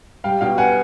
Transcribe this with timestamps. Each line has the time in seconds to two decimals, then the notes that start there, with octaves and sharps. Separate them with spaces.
0.24 G3 F5 G5
0.41 B2 F5 G5
0.58 B3 F#5 G#5